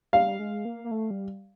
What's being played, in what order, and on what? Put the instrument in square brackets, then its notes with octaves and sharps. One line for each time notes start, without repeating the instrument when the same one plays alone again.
[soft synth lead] G3 [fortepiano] F5
[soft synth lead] G#3
A#3
A#3
A3
G3